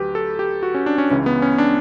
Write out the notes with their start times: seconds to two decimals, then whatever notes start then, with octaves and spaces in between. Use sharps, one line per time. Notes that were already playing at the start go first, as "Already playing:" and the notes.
Already playing: D2 F#3 G4 B4
0.15 A4
0.39 G4
0.63 F#4
0.74 C#4
0.86 D4
0.98 C#4
1.10 C#2 C#3 E3 C#4
1.26 B3
1.42 C#4
1.58 D4